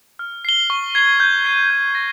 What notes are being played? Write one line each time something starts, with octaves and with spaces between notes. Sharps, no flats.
F6
C7 G7
C#6
G#6 C7 G7
G6
C7 D#7 G7
G6
A#6